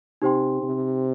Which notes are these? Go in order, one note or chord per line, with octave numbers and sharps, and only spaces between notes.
C3 D#4 G4 C5 G5 C6
C3